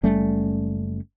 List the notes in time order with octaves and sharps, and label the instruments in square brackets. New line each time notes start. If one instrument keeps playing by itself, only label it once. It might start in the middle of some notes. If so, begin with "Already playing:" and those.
[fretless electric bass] F#1 G3 A3 C#4